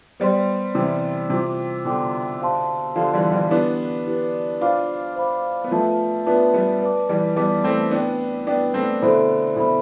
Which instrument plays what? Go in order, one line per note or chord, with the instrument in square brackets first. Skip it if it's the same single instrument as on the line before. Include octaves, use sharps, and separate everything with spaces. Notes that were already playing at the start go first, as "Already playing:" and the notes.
[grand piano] G3 B3 [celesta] C5 G5 C6
[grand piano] C3 E3 [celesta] C5 G5 C6
[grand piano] C3 [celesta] F4 C5 G5 D6
[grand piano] B2 D3 [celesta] F4 C5 G5 D6
[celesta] G4 C5 F5 A5 C6
[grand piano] D3 F3 [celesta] G4 C5 F5 A5 C6
[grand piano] E3 G3
E3 G3
[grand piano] B3 D4 [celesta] E4 G4 B4 D5
[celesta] E4 G4 B4 D5
[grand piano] D4 F4 [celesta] C5 F5 B5 D6
[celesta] C5 F5 B5 D6
[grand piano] B3
[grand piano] F3 A3 [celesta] F4 B4 E5 A5
[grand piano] B3 D4 [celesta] F4 B4 E5 A5
[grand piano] G3 B3
[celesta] B4 D5 A5 D6
[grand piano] E3 G3
[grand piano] G3 B3 [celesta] B4 D5 A5 D6
[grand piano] A3 C4
[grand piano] B3 D4 [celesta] E4 B4 D5 G5
[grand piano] B3 D4 [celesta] E4 B4 D5 G5
[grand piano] A3 C4
[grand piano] B2 D3 [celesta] E4 A4 C5 E5 B5
[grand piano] B2 [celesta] E4 A4 C5 E5 B5